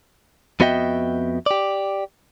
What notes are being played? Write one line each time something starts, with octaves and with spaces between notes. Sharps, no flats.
F2 B3 F#4 D#5 E5 G5
G4 D5